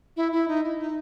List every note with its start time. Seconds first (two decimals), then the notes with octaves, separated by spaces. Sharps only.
0.17 E4
0.32 E4
0.48 D#4
0.64 E4
0.79 D#4